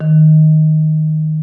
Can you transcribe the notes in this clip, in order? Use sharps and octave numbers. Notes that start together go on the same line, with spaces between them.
D#3